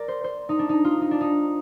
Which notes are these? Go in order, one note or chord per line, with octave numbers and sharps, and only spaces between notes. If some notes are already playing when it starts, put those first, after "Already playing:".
Already playing: A#4 D5
C5
C5
D#4
D4
D#4
F4
D#4
D4
D#4